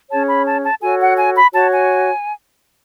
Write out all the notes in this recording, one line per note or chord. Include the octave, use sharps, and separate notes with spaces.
C#4 G#4 C#5 A5
B5
A5
A5
F#4 A4 C#5 G#5
F#5
G#5
B5
F#4 C#5 A5
G#5